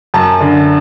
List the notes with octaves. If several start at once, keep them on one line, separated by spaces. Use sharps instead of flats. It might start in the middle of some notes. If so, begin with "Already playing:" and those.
F#2 A5
D3